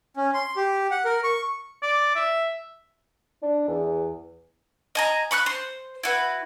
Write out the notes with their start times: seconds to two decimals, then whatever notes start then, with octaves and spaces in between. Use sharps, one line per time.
0.17 C#4
0.34 C6
0.57 G4
0.91 F#5
1.05 A#4
1.24 C#6
1.83 D5
2.15 E5
3.43 D4
3.68 E2
4.95 D#5 G#5 A#5
5.31 B5 C#6 E6 F#6
5.46 C5
6.03 E4 F#4 B4